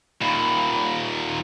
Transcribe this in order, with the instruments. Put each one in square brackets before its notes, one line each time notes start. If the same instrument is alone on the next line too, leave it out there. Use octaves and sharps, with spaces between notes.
[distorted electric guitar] D#2 A#2 [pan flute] B5